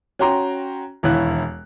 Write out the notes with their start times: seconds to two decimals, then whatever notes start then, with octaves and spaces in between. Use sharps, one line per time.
0.19 C#4 F#4 G5 A#5 C6
1.03 E1 D#2 E3 E4 C#5 F#6